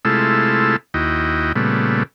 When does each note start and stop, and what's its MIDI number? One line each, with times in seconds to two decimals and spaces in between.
0.05 0.76 48
0.05 0.76 56
0.05 0.76 57
0.05 0.76 64
0.05 0.76 65
0.05 0.76 69
0.94 1.52 39
0.94 1.52 64
0.94 1.52 66
0.94 1.52 75
0.94 1.52 79
1.55 2.03 46
1.55 2.03 49
1.55 2.03 55
1.55 2.03 57
1.55 2.03 59